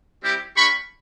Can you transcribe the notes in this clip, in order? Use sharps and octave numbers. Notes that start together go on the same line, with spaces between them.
G3 C4 E4 G4
A#3 D4 G4 B5 C#6